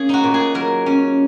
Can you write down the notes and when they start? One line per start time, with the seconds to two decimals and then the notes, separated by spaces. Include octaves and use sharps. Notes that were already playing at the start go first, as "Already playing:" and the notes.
Already playing: A#3 C#4 G#4
0.09 D#4 F#4
0.24 A#2
0.34 G#4
0.54 F#3 A#4
0.86 C#4